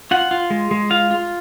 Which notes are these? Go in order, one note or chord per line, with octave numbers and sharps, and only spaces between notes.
F4 F#5
F4
G#3
G#3
F4 F5
F4